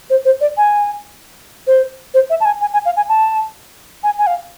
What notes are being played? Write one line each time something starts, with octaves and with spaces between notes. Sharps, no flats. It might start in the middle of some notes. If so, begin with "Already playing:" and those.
C5
C5
D5
G#5
C5
C5
E5
A5
G#5
G#5
G#5
F5
G#5
A5
G#5
G#5
F5